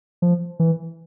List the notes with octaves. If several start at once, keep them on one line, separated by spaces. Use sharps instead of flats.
F3
E3